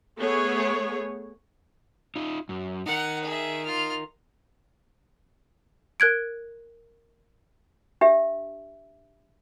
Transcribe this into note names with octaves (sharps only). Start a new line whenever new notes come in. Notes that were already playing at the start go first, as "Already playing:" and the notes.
A3 B3 G#4 C#5
D#4 F4
F#2
D#4 A#4 F#5
G#4 E5
F4 F6
A#4 F#6 G#6 D7
D4 G4 E5